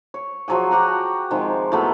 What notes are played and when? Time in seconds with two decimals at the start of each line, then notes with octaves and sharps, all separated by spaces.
0.14 C#5
0.48 F3 F#3 G#4 G#5
0.71 F#4 G4 F#5 A#5
1.30 C3 D#3 F3 G#3
1.72 A2 F#3 A3 B3